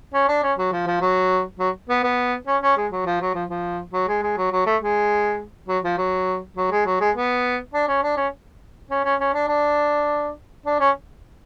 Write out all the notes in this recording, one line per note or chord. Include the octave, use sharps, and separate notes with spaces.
C#4
D4
C#4
F#3
F3
F3
F#3
F#3
B3
B3
C#4
C#4
G#3
F#3
F3
F#3
F3
F3
F#3
G#3
G#3
F#3
F#3
A3
G#3
F#3
F3
F#3
F#3
G#3
F#3
G#3
B3
D4
C#4
D4
C#4
C#4
C#4
C#4
D4
D4
D4
C#4